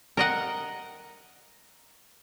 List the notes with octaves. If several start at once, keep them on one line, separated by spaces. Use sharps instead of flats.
A#4 D#5 F#5